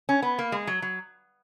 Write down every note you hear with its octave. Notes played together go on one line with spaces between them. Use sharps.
C#4
B3
A#3
G#3
F#3
F#3